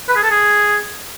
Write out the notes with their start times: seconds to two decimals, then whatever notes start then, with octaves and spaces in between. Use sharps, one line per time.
0.09 B4
0.16 G#4
0.23 A4
0.31 G#4